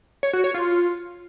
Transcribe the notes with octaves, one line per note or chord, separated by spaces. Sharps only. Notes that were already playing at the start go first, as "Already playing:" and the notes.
C#5
F#4
C#5
F4